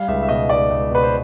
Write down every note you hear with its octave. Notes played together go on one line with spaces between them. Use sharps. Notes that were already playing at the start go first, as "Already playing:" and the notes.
Already playing: G3 F5
C#2 E5
E5
B2 D#5
C#2 D5
C#2
B2 B4
C5